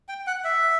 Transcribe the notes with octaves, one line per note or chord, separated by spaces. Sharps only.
G5
F#5
E5